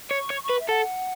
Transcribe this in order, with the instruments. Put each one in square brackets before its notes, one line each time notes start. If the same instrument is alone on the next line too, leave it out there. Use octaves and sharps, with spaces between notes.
[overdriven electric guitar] C#5
[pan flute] C#6
[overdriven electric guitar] C#5
[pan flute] C#6
[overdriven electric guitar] B4
[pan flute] E5
[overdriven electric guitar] A4 [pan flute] F#5